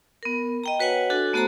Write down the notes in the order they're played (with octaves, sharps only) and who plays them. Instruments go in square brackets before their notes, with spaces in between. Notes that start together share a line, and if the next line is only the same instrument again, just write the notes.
[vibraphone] B3 A#4
D#5 G5 A#5
F#4 B4 C#5 F#5 G#5
D4 F#4 A4 G#5
A3 B3 F#4 A4 C5 A#5